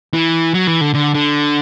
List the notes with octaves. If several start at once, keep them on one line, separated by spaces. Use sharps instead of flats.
E3
F#3
E3
D3
D3
D3